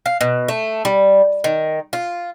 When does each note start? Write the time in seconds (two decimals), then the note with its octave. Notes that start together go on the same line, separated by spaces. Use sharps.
0.06 F5
0.21 B2
0.48 A3
0.85 G3
1.44 D#3
1.93 F4